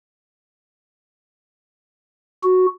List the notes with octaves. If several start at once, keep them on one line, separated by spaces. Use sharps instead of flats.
F#4